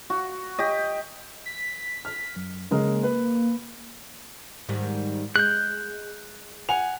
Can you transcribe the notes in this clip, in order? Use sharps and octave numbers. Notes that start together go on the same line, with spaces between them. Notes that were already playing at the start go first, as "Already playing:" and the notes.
F#4
G4 D#5
B6
F6
F#2
C#3 G#3 A#3 A#4
B4
G#2 D#3 G3
G#3 F#6 G6
F#5 G#5 F7